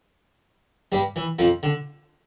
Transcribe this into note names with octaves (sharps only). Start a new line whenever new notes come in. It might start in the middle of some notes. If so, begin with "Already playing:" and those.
G2 G3
E3
F2 F3
D3